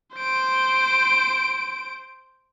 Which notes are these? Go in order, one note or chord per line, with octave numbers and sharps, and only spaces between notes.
C5 D7